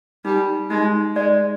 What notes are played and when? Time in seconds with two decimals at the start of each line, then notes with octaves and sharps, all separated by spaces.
0.25 G3 D#4
0.70 G#3 D#4
1.16 G#3 D5